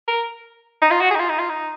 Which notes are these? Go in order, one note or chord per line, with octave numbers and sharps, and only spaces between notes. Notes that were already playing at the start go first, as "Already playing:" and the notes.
A#4
D#4
F4
F#4
G#4
D#4
F4
D#4
F4
D#4